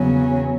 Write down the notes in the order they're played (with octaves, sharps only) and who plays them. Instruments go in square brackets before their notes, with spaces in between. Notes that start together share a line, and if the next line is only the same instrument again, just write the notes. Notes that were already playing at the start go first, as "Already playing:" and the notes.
Already playing: [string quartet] E2 C#3 F#3 C#4